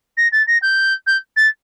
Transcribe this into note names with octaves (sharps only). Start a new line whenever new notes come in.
A#6
A6
A#6
G6
G6
A6